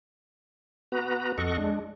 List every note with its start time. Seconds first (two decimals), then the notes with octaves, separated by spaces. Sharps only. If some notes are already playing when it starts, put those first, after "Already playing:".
0.92 B3 F#4 B4 A#5
1.38 F2 A4 D#5 F#5 C#6
1.58 G#3 D4